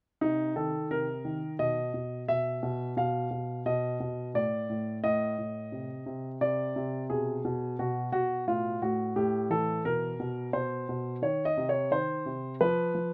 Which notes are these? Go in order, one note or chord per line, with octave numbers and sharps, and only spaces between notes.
C3 D#4
D#3 A4
C3 A#4
D#3
B2 D#5
B2
B2 E5
B2
B2 F5
B2
B2 D#5
B2
A2 D5
A2
A2 D#5
A2
C3
C3
C3 D5
C3
B2 G#4
B2
B2 F#4
B2 F#4
A2 F4
A2 F#4
A2 G4
E3 A4
B2 A#4
B2
B2 C5
B2
D#3 C#5
D#5
C3
C#5
D#3 C5
C3
F3 B4
F3